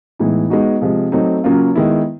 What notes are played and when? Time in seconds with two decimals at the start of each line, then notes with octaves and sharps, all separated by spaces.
0.19 A2 E3 G#3 B3 D#4
0.50 G#3 B3 D#4 F#4
0.81 C3 F3 G#3
1.12 F#3 A3 C4 D#4
1.44 C#3 F#3 A#3 C#4 F4
1.75 D#3 G#3 B3 E4